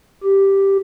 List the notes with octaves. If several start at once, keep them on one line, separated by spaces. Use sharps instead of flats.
G4